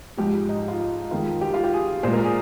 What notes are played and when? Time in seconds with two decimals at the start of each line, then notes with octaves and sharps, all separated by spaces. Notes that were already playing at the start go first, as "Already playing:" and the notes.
0.17 G#2 F3 G#3 G4
0.49 D#4
0.68 F4
0.80 D#4
1.11 F2 D#3 G#3 F4
1.41 G4
1.54 F4
1.64 G4
1.73 G#4
2.03 A#2 G#3 C5
2.13 A#4
2.24 G#4